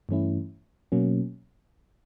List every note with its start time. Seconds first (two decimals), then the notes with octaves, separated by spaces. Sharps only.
0.09 G2 E3 A3 C#4 E4
0.92 B2 F#3 A#3 C#4